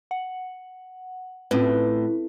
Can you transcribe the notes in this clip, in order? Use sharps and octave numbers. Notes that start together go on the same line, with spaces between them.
F#5
A2 C4 C#4 F4 B4